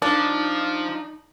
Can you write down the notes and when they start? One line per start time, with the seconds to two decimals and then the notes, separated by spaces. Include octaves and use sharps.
0.02 F3 D4 D#4